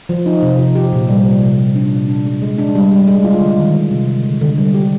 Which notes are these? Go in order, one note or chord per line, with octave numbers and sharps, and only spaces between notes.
F3
D#4
C3
F3
G4
A#2
G3
C3
C3
G3
D4
A#2
D4
G#3
G#3
D4
G3
G3
G#3
F4
D3
D#3
F4
C3
G#3
D3
D3
G3
G4